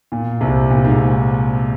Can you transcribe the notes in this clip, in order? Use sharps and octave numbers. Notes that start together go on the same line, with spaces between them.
A#2
C2 C3
A#2
G#2